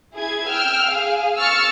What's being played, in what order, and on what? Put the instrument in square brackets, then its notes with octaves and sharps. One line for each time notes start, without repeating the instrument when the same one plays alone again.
[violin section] E4 G#4 G#6
G5 E6 F6
G#4 F5
C#6 E6 F6 A6 C#7